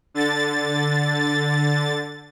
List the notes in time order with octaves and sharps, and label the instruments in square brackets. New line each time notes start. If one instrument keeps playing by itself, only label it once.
[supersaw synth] D3 A6